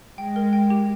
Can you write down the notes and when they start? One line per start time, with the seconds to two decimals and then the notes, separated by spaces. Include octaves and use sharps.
0.17 G#3 G5
0.36 A#4
0.53 G5
0.70 G4